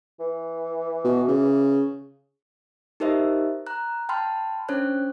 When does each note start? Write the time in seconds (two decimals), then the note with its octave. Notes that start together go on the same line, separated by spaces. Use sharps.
0.20 E3
1.04 B2
1.28 C#3
3.00 D#4 G4 A#4 C5 D#5 E5
3.67 A#5 F#6
4.09 G5 A5 B5 C6 F6
4.69 C#4 D4 C5 C#5 F#6